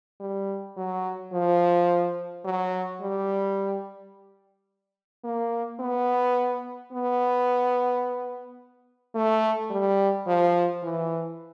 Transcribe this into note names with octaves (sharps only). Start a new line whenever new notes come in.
G3
F#3
F3
F#3
G3
A#3
B3
B3
A3
G3
F3
E3